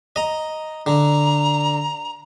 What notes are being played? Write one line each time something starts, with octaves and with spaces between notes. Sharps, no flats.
D#5 A#5
D3 A#5